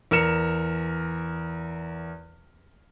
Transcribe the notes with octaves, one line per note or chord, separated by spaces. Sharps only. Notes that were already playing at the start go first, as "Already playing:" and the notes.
E2 A#4 F6 C#7 E7